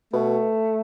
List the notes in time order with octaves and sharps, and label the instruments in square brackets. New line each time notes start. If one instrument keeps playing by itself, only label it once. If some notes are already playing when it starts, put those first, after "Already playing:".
[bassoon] B2 [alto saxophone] A3